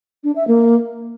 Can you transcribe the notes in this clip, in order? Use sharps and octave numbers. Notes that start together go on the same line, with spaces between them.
D4
E5
A#3